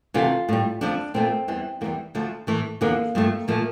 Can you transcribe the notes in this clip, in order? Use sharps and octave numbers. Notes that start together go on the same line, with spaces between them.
D2 C3 E3 A3 F4
A2 G3
F2 D3 F3 A3 D4
A#2 F3 A3 C4
E2 E3 G3
E2 E3 G3 A#3
D2 D3 F3 A3
A2 E3 A3
E2 D3 F3 A#3
G2 F3 A3
A#2 F3 A3 A#3